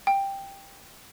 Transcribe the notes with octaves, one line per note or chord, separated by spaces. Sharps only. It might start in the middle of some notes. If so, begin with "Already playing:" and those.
G5